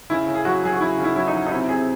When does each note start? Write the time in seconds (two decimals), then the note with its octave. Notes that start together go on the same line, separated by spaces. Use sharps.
0.10 C#3 E4
0.28 C#3
0.35 G#4
0.45 F#3 F#4
0.63 F#3 G#4
0.73 F#4
0.80 C#3 E4
0.98 C#3
1.04 E4
1.16 F#3 E4
1.27 D#4
1.33 F#3
1.47 D#4
1.51 C3 E4
1.69 C3 G#4